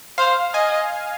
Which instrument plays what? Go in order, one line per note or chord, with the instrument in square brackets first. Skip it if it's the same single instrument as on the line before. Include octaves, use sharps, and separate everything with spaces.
[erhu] C5 [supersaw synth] F5
[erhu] D#5 [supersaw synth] G#5